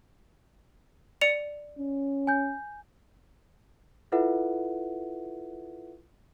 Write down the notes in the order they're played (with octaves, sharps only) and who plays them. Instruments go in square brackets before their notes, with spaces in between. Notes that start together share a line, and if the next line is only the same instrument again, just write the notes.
[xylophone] D5 C#7 F7
[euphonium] C#4
[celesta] G#5 G6
E4 F4 A4 B4 E5 F#5